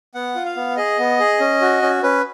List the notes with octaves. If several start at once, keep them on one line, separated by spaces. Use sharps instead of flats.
B3 F#5
F4
F5
B3
G#4 D#5
B3
G#4
C#4
F#4
C#4
C#4 B4